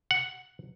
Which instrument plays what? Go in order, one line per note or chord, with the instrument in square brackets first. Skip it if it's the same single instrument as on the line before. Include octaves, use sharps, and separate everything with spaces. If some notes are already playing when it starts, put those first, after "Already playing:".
[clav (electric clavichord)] F#5